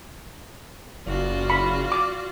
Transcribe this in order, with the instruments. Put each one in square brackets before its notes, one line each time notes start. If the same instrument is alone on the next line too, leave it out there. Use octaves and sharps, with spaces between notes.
[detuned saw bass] F#1 [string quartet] F4 F#4 D5
[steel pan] B5
D6